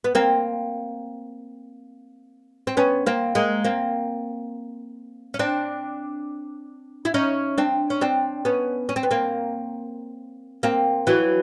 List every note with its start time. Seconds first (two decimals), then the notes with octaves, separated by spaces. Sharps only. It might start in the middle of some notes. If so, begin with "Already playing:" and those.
0.04 B3
0.15 A#3 C4
2.67 C4
2.77 B3 C#4
3.06 A#3 C4
3.35 G#3 A#3
3.64 A#3 C4
5.34 C#4
5.39 C4 D4
7.05 E4
7.14 C#4 D#4
7.58 C4 D4
7.90 C#4
8.01 C4 D4
8.45 B3 C#4
8.89 C#4
8.96 C4
9.03 B3
9.11 A#3 C4
10.63 A#3 C4
11.07 E3 F#3